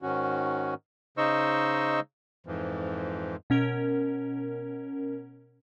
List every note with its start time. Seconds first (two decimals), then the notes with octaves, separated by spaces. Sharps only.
0.02 G#2 D#3 C#4 F#4
1.18 C#3 D#4 C5 D#5 C#6 E6
2.46 F2 G#2 E3 F3
3.50 B2 C#4 A#4